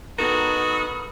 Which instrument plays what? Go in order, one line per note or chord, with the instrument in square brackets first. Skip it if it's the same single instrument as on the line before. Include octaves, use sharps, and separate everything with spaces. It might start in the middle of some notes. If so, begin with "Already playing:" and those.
[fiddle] B3 [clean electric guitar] D#4 A4 A#4 [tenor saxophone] F#4 [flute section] B5 D#6 F6